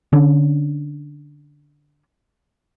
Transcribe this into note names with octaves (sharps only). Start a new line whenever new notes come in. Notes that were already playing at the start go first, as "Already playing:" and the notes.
D3 C#4 D4